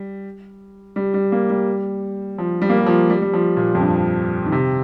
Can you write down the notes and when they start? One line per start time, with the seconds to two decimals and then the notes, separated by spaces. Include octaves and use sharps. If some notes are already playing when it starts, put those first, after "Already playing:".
Already playing: G3
0.96 G3
1.14 G3
1.32 A#3
1.50 G3
2.38 F3
2.62 G3
2.70 A#3
2.78 G3
2.86 F3
3.10 G3
3.22 G3
3.33 F3
3.57 A#2
3.75 F2
3.81 G2
4.46 D#3
4.52 C3